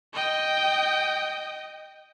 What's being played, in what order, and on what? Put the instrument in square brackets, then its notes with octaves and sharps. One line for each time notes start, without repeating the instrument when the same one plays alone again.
[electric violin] D#5 G5